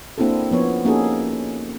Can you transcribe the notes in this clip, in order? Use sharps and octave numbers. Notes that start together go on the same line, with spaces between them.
A#3 C4 D4 E4 F#4 A4
F3 B3 C#5
A#3 C#4 D#4 F#4 G#4 A4